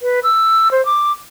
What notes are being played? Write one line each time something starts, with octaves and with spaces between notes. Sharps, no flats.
B4
E6
C5
D6